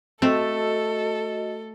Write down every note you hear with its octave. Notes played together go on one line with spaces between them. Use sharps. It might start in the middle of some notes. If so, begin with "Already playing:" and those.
A3 C4 F#4 A4 D#5